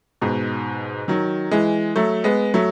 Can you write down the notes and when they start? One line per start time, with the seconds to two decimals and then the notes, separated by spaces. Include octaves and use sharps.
0.21 G#2 B2
1.08 D#3 F#3
1.51 E3 G#3
1.96 F#3 A3
2.24 G#3 B3
2.54 F#3 A3